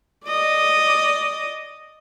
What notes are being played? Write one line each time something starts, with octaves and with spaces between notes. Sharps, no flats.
D5 D#5